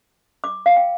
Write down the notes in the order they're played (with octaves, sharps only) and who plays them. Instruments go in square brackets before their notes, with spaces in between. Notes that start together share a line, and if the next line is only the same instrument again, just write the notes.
[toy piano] D6
F5
G5